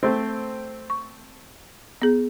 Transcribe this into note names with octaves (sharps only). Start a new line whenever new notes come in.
A3 C4
C#6
B3 G#4